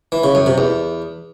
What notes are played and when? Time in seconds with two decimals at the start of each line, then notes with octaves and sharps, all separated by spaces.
0.12 E3
0.24 C#3
0.35 F#2
0.46 C3
0.58 E2